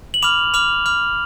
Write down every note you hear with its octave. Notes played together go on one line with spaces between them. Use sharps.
F#7
B5 D6 F6 F7
B5 D6 F6 F7
B5 D6 F6